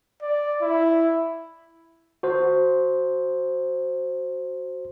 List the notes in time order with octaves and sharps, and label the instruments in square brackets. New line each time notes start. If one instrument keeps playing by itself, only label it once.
[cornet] D5
E4
[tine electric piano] F#4 C5